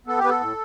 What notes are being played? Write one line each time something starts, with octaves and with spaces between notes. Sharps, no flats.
B3 A4
G4
B3 B4
A4
A2